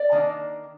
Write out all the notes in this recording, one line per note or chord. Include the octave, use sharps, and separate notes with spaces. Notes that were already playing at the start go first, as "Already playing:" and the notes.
Already playing: D5
D#3 A#3 D4